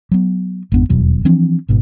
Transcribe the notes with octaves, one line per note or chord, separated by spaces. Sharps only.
F#3 B3
G#1 F2 B3 D4
D#1 E2 B2 F#3
E3 F3 C4 D4
G#1 G#2 B2